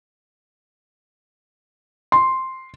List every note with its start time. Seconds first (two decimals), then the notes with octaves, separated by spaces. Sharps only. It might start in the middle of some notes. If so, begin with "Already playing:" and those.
2.12 C6